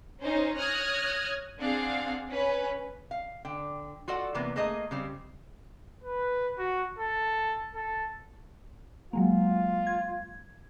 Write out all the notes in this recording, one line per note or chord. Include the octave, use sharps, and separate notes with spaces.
C#4 D#4 C5
C#5 D#6 F6 F#6 G#6 A#6
C4 D4 G#4 F5 F#5
C#4 B4
F5
D3 G5
F4 F#4 A4 D5 F#5
C3 E3 A#3 B3
A3 A#3 G#4 D#5 A#5
C#3 G3 C4
B4
F#4
A4
A4
F#3 G#3 A#3 F4
G#6